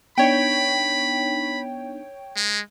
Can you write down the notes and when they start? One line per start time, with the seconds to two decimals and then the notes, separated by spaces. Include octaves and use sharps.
0.18 B3 D4 D#4 C#5 G5 B5
2.36 G#3